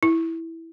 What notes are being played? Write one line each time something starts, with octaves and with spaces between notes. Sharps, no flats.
E4